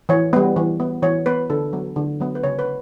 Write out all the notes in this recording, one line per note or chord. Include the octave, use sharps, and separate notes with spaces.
E3 C#5
G3 B3
E3
B3
E3 C#5
B3 B4
D3 A4
F#3 B3
D3
F#3 B3
B4
C#3 C#5
B4